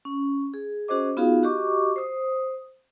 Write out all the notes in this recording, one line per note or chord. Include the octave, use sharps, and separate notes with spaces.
C#4
G#4
C#4 F#4 G#4 C5 D#5 D6
B3 D#4 F4 F#4 G#4 F5
F#4 G4 D#5 C#6 D6
C5 D#6